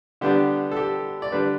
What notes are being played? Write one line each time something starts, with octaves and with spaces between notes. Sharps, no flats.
D3 G3 B3 D4 G4
A4
G4
D5
D3 G3 D4 B4